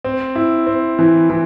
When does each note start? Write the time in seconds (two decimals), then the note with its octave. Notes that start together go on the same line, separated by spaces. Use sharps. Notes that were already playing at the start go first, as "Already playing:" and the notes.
0.05 C4
0.36 E4
0.67 C4
0.99 E3
1.30 E3